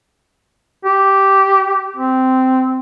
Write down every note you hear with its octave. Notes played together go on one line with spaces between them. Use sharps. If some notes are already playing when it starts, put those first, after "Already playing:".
G4
C4